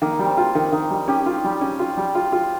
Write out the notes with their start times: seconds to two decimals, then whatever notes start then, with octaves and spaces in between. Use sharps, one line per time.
0.02 D#3 A#3
0.19 G3
0.25 C4
0.37 F4
0.55 D#3
0.72 D#3 D#4
0.91 G3
1.08 C#4 G4
1.26 F4
1.44 G3
1.61 C#4
1.79 F4
1.97 G3
2.15 F4
2.32 F4